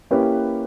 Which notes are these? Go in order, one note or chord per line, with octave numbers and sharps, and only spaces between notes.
A#3 C#4 E4 G4 B4